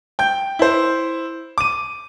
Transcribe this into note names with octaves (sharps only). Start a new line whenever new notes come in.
G5 G6
E4 C5
D6 D#7